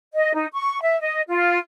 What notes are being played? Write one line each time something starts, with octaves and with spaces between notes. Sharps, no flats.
D#5
D#4
C#6
E5
D#5
F4